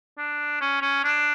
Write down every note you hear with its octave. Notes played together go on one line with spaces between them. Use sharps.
D4
C#4
C#4
D4